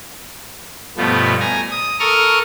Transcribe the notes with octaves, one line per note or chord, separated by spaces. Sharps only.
G2 B2 F3 A3 B3
G#5 A#5
D#6
A4 A#4 C#6 D#6 F6